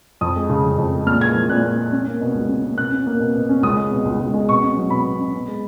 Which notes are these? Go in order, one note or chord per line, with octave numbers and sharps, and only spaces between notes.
F2 D#6
G#3
C#3
F2
F2
G#3
A#2 F6
G#3 G#6
F3
A#2 F#6
A#2
G#3
C#4
A#3
B2
C#2
C#4
A#3
B2 F#6
C#4
A#3
B2
B2
C#4
C#2 D#6
G#3
B2
C#2
C#2
G#3
B2 C#6
C#4
F#3
B2 B5
B2
C#4
B3
G#3